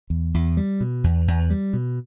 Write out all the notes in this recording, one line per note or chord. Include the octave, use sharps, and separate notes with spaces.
E2
E2
G3
B2
E2
E2
G3
B2